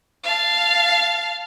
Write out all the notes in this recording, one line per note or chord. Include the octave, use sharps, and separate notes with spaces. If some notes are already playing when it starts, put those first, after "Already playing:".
F5 A5